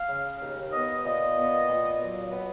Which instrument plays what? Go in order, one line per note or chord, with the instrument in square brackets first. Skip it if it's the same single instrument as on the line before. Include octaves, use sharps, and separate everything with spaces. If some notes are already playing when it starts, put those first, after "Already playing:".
Already playing: [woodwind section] F5
C#3
D#2
B3 D#5
A#2 D#5
B3
A#2
F#3
B3